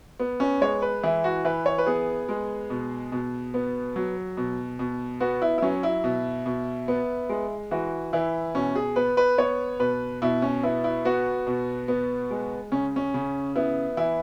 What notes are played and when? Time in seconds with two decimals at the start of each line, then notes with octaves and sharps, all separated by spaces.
0.20 B3
0.40 C#4
0.61 G#3 C#5
0.82 B4
1.03 E3 E4
1.24 F#4
1.45 E3 B4
1.66 C#5
1.78 B4
1.87 B3 G#4
2.29 G#3
2.70 B2
3.12 B2
3.54 B3
3.96 F#3
4.37 B2
4.79 B2
5.21 B3 F#4
5.42 E4
5.58 E4
5.62 F#3 C#4
5.83 E4
6.04 B2
6.46 B2
6.88 B3
7.29 G#3
7.71 E3 F#4
8.13 E3 E4
8.55 B2 C#4
8.76 G#4
8.96 B3 B4
9.17 B4
9.38 B3 C#5
9.80 B2 B4
10.22 B2 E4
10.42 C#4
10.63 B3 E4
10.84 E4
11.05 B3 F#4
11.47 B2
11.88 B3
12.31 G#3
12.72 C#3 C#4
12.96 C#4
13.14 C#3
13.56 B3 E4
13.97 E3 E4